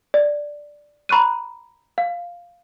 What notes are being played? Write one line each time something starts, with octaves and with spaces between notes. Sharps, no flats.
D5
A#5 B5 C#6 F#6 D#7
F5